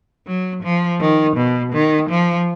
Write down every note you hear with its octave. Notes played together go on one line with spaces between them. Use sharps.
F#3
F3
D#3
B2
D#3
F3